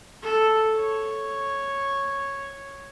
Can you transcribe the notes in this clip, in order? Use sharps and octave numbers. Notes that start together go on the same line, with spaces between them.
A4
C#5